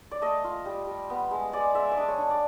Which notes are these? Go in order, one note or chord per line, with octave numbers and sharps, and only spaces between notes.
D5
A3 D#5
F4
G3
G3
B3
G#3
G#3 D5
G#3 E5
D5
D4 D#5
C#5
D4
D5